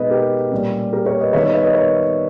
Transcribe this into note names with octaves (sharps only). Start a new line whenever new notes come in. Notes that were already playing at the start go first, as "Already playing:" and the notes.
Already playing: B2 G#3 D#4 B4 D#5
G4 A#4
A#2 G3 C#4
G4 A#4
A#4 C#5
B4 D#5
D#3 G3 B3 D#4 C#5 E5
B4 D#5
C#5 E5
B4 D#5
A#4 C#5